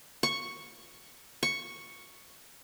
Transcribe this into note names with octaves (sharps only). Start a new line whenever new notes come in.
C#6
C#6